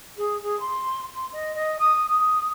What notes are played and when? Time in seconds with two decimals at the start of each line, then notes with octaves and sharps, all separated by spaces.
0.16 G#4
0.42 G#4
0.59 C6
1.15 C6
1.32 D#5
1.54 D#5
1.78 D#6
2.08 D#6